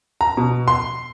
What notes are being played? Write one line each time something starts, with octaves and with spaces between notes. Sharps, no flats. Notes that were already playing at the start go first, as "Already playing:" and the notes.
A#5
B2
C6